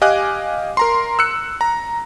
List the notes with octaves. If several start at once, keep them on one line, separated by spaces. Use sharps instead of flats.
G4 D#5 F5 G#5 D6 F#6
A#4 A#5 C6
E6 F#6 C#7
A#5